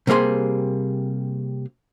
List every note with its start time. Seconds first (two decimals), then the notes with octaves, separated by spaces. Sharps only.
0.07 C3 G3 A#3 G#4 C6